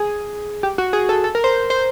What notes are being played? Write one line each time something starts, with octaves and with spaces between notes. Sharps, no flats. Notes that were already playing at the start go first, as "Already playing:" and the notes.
Already playing: G#4
G4
F#4
G#4
A4
A4
A#4
C5
C5